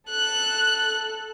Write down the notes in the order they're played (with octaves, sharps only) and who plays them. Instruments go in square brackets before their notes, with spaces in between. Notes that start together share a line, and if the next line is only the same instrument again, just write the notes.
[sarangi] A4 [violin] F#6